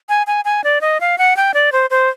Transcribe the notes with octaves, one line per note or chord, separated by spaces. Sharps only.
G#5
G#5
G#5
D5
D#5
F5
F#5
G5
D5
C5
C5